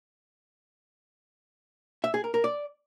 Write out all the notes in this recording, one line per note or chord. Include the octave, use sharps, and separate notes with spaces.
E5
G#4
A#4
A#4
D5